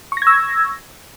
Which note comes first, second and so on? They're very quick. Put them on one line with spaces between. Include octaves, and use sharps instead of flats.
C#6 A#6 G#6 E6